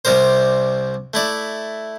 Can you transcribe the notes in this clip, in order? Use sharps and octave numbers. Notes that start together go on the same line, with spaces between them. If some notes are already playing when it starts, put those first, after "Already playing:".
C2 C3 G3 A#4 C5
A3 E4 D5